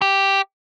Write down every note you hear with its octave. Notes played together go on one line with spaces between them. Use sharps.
G4